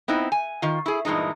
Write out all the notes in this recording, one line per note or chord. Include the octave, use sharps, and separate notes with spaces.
B3 C4 D#4 E4
G#5
D#3 F4
E4 G#4
G2 A#2 E3 G#3 D#4